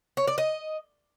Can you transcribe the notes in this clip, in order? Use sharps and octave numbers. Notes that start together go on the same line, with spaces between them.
C#5
D5
D#5